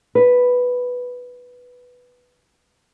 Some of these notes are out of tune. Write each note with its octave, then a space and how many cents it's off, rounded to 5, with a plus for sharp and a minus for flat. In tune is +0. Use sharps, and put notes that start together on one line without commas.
B4 +0